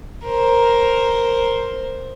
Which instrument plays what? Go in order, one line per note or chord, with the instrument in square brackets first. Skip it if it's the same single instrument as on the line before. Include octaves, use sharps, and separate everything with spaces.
[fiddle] A#4 C5